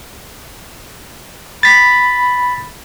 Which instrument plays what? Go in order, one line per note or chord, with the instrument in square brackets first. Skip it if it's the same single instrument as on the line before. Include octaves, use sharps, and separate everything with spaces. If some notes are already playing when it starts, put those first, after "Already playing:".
[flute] B5 [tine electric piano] A6 B6